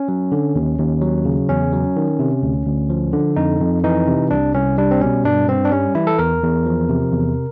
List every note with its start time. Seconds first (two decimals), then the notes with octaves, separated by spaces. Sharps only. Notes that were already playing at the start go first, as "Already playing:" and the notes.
Already playing: C#4
0.08 F#3
0.32 D3
0.55 D#2
0.78 D#2
1.02 F#3
1.25 C#3
1.49 E2 C#4
1.73 F#3
1.97 D#3
2.19 C3
2.43 D2
2.66 D2
2.90 F3
3.13 D3
3.36 F2 D#4
3.61 F2
3.84 E3 D#4
4.07 C3
4.31 C2 D4
4.55 C2 C#4
4.78 G3 D4
4.91 C4
5.01 B2 C#4
5.25 G2 D4
5.48 G2 C4
5.65 D4
5.72 G3 C#4
5.95 E3 E4
6.07 A4
6.18 E2 A#4
6.43 E2
6.66 F3
6.89 C3
7.12 E2